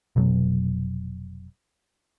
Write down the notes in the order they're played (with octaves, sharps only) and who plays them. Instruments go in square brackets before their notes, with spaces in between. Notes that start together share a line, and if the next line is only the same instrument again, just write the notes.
[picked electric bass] F1 B2 F#3 B3